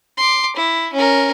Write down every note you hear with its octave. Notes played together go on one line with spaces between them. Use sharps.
C6 D6
E4
C#4 A#4